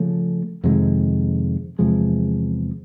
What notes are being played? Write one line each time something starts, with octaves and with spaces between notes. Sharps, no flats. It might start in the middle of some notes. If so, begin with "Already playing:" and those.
Already playing: C#3 F3 A3
F2 C3 D#3 G#3
E2 C3 F3 G#3